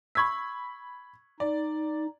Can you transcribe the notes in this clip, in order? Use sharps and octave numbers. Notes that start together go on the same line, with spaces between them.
B5 C#6 E6 G#6 B6
D#4 D5